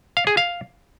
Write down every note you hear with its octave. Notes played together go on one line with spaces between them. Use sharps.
F5
G#4
F5